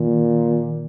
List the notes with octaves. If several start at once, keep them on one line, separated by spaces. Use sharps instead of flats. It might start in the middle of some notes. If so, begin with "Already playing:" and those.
Already playing: A#2 D#3